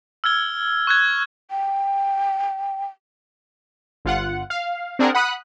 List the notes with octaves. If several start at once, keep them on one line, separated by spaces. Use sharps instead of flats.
E6 F6 G#6 G7
C#6 F#6 G#6
G5
G1 F4 F#5
F5
C4 D4 G#4 A#4 F#5
F#5 B5 D#6 F#6